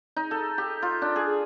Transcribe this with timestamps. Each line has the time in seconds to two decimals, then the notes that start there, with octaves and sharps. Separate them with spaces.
0.16 D#4
0.31 A4
0.58 G4
0.82 F4
1.02 D4
1.16 G#4